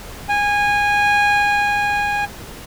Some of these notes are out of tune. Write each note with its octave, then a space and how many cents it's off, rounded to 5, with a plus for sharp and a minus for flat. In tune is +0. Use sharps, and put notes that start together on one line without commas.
G#5 -20